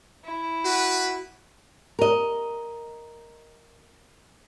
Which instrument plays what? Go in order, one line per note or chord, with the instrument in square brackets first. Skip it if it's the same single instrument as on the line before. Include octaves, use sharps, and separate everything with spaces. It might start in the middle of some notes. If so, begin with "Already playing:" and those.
[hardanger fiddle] E4
[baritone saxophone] F#4 [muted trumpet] B4
[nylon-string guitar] A#4 D#5